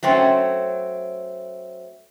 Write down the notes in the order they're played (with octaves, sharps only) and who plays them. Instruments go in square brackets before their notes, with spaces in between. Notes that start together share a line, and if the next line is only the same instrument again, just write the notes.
[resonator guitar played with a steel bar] F#3 A3 C4 C#4